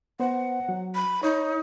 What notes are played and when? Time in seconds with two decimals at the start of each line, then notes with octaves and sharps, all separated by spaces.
0.20 B3 C5 F#5
0.69 F#3
0.95 B5
1.23 D#4 C#5